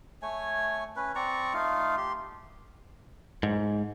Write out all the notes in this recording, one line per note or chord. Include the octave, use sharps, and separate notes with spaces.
A3 C#5 G#5
C#4 B4
C4 D5 A#5 C#6
A3 D#4 F4 F5
G4 C6
G#2